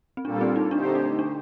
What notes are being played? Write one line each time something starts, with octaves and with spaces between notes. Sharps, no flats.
C4
A#2 G3 A#3 D4 F4 A4
C4
D#4
D3 A3 D4 D#4 G4 C5
D#4
D4